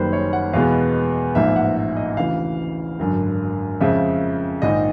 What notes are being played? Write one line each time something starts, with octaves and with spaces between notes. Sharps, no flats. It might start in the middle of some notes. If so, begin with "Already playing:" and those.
Already playing: F#1 F#2 D#3 G3 A#3 B4 C5
C#5
F#5
E2 B2 G#3 B3 F5
A1 G#2 F3 A#3 E5
F#5
E5
D#5
D2 C#3 E3 F5
G#1 F#2 D3
F2 C#3 F3 G#3 E5
A#1 G#2 D#3 D#5